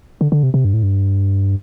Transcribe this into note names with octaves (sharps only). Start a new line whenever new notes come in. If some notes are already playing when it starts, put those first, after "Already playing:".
D3
D3
C3
C3
G2
A2
G2